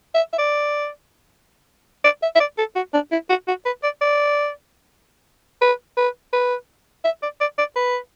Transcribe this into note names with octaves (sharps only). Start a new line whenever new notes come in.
E5
E5
D5
D5
E5
E5
D5
A4
F#4
D4
E4
F#4
F#4
B4
D5
D5
B4
B4
B4
E5
D5
D5
D5
B4